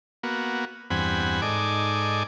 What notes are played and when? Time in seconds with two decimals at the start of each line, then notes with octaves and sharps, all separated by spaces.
0.23 A#3 B3 F#4
0.90 E2 G2 C4 F#5 G#5 B5
1.42 G#2 D#4 A4 D5 G#5 D6